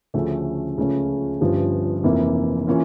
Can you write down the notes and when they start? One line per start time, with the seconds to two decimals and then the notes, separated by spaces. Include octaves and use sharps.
0.14 D2 C#3 F3 A3 C#4
0.78 C#2 C#3 F3 A3 C#4
1.41 G1 G2 F3 C#4
2.04 F1 F2 E3 A#3 E4
2.67 E3 A#3 C#4 F4